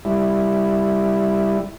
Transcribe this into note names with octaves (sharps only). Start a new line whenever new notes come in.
G3 E4